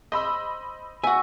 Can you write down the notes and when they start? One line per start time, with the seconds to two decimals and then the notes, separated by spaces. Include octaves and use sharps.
0.12 C5 D#5 B5 E6
1.04 F#4 E5 G#5